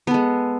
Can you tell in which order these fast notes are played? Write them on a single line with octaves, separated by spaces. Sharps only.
B3 A4 G#3